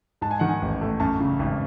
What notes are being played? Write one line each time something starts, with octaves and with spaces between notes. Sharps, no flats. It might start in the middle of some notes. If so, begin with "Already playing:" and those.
G#2 A5
G#5
D#3 F#5
G#5
A1
A3
F#2 A5
C#3
G#1